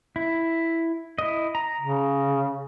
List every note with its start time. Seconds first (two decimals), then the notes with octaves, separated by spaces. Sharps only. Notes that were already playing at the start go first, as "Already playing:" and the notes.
0.16 E4
1.18 E4 D#5
1.55 A#5
1.81 C#3